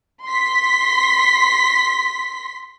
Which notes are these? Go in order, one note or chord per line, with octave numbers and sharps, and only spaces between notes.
C6 B6